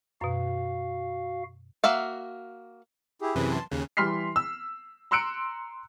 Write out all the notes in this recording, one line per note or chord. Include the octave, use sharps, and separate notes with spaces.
F#2 B2 F#4 F5
A#3 F#4 E5 F5
E4 G4 G#4
F#2 C3 E3 G#4 B4
A5 C6
D#2 C#3 F#6
E3 G3 C6 F6 B6 C7
E6
A#5 C6 E6 F#6 C#7 D7